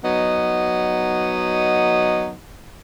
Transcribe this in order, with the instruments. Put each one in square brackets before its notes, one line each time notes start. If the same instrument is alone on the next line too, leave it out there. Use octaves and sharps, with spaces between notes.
[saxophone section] F#3 B3 D#4 D#5